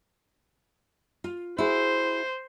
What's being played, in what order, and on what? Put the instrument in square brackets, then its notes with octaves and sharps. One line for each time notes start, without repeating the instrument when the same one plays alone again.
[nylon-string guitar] F4
[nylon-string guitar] E4 F#4 G#4 [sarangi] C5